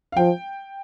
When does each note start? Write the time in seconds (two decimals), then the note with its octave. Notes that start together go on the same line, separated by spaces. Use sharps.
0.12 F5
0.17 F3 G5